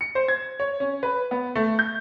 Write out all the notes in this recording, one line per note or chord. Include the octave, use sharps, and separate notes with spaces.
C#7
C5
G#6
C#5
C#4
B4
B3
A3
G6